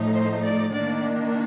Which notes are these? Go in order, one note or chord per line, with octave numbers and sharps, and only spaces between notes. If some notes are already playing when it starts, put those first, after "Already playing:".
Already playing: A2 F3 A3 D#4
C5
D5
D#3 A#3 D4 D5